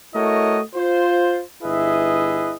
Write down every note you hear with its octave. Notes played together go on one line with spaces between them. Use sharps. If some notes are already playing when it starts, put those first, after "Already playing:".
A3 E4 F#4 A#4 C#5 D#5
F4 C5
G1 E4 G#4 B4 D#5 E5